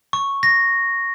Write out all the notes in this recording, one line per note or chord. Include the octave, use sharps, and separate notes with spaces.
C#6
A#6